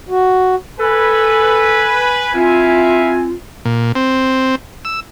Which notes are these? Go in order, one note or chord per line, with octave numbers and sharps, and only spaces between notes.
F#4
A4 B4 G#5
C4 E4 F4 E5 F5
A#2
C4
E6